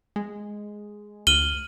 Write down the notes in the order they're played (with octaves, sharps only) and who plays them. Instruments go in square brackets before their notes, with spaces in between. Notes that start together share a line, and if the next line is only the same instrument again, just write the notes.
[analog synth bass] G#3
[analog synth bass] D2 [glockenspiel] F6 D#7 F#7 [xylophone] G7